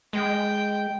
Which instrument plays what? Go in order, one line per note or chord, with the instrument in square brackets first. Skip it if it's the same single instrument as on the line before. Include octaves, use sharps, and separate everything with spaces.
[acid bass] G#3 [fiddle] G5